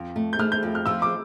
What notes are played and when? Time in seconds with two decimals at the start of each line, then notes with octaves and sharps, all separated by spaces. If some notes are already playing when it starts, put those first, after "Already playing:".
Already playing: F2
0.16 A3
0.33 G6
0.39 A3 F6
0.52 G6
0.63 F2
0.75 F6
0.86 F3 E6
1.02 D6